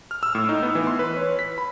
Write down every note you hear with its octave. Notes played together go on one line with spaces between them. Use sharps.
F6
E6
A2
D#4
B3
E3
C6
B4
C#5
B6
B5